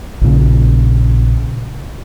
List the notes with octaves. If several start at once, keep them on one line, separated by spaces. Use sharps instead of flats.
A#1 A#2 C#3